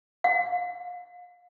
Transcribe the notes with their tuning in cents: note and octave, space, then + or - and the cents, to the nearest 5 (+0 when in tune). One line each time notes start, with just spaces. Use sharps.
F5 +35